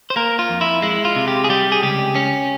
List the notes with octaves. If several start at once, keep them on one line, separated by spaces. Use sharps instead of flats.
C5
A#3 A#4
F4
F2
E4
G#3 E4
F4
C3
G4
G#4
G3 G4
G#4
C#2 G4
C#4